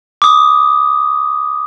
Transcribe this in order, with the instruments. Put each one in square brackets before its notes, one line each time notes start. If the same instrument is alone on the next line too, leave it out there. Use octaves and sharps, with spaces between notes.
[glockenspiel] D6 D#6